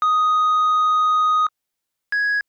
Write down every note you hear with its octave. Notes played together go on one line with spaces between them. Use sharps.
D#6
G#6